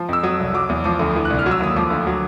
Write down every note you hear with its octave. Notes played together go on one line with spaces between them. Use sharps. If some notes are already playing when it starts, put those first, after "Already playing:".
Already playing: F3
F2 E6
F#3 D#6
C2
F#3 D6
E2
F3 D6
D2
E3
C2 F#6
F6
F#3
E6
D#2 D#6
F3 D6
D2
F#3